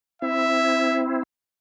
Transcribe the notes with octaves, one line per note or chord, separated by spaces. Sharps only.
C4 E4 E5